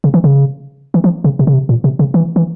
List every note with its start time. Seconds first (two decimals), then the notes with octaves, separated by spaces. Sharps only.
0.04 C#3
0.14 E3
0.24 C#3
0.94 E3
1.04 F3
1.24 C#3
1.39 C3
1.47 C#3
1.54 C3
1.69 A#2
1.84 C3
1.99 C#3
2.14 E3
2.36 E3